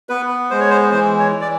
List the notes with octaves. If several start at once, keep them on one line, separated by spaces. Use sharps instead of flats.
B3 B4
G#3 C5
C#5
C5
E3 C5
C#5
E3
D5